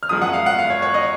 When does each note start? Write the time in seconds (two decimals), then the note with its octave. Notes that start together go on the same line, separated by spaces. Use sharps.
0.03 F6
0.09 F#2 F3 G#3 D#6
0.22 F#5
0.33 F5
0.46 F#5
0.58 F5
0.70 C#5
0.82 C#5
0.94 D#5